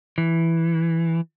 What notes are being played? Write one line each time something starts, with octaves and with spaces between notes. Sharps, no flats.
E3